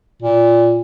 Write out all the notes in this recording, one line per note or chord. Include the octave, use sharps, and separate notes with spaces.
A#2